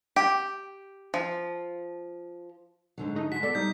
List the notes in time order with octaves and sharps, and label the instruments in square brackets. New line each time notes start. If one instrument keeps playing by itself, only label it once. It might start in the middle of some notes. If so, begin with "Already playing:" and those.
[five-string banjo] G4
F3
[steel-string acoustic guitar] G#2 D3 F#3
[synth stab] A3 D#4
[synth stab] G#3 F#4 [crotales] B6
[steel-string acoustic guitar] B3 [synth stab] A4 [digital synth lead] D5
[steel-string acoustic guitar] G3 [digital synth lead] D#4 [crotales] G6